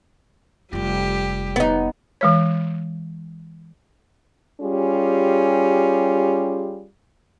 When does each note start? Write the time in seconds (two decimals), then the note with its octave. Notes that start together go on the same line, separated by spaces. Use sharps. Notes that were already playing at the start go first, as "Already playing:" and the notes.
0.73 F1 G3 F4 G4
1.56 B3 D#4
2.21 E3 G#3 C#5
4.61 G3 C#4 F4 G4 G#4